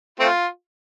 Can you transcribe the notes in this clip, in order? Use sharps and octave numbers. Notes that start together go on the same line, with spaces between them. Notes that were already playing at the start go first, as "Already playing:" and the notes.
A3 C4 F4